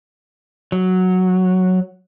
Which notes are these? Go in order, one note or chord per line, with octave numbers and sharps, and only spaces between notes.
F#3